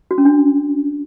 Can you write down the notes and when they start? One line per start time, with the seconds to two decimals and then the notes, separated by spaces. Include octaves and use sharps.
0.11 F#4
0.18 C#4
0.25 D4